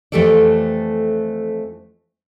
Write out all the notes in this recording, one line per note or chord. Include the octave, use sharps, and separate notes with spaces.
F2 E3 A3 G4 A4 D5